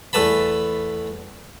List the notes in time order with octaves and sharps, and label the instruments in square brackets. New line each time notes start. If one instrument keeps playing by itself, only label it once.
[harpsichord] E2 A3 B4 A5 B5